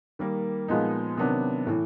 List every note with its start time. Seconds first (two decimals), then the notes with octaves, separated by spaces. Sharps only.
0.19 D#3 G3 A#3
0.68 A#2 F3 G#3 B3 D#4
1.17 C3 D#3 F#3 B3 D4
1.67 A2 E3